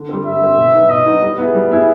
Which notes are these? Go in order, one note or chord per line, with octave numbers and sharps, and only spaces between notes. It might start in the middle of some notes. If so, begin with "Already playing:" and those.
Already playing: D3
G3 C4
D3 E5
G3 C4
B2
F#3 B3 D#4
B2 D#5
F#3 B3 D#4
G3
B3 E4 G#4
G3
B3 E4 G#4